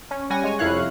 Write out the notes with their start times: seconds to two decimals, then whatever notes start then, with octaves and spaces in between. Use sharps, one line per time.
0.11 C#4
0.30 G3 C#4 F#5 G#5 A#6
0.44 G#3 C#5 G#5
0.59 F2 C3 E4 C#5 F5 F#6